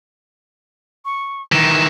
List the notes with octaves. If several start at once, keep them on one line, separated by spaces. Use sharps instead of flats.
C#6
D#3 E3 E7